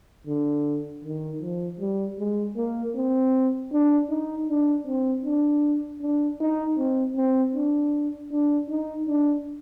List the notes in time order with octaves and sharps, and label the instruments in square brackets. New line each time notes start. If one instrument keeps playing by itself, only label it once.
[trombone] D3
D#3
F3
G3
G#3
A#3
C4
D4
D#4
D4
C4
D4
D4
D#4
C4
C4
D4
D4
D#4
D4